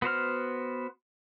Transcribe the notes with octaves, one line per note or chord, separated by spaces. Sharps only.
B3 F#4 C5 F6